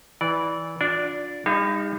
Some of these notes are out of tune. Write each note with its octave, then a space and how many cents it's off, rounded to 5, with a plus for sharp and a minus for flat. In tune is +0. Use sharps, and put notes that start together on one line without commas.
E3 -15 D5 -15
D4 +0 F4 +35 D5 -20
G3 +40 D#4 +0 F5 -45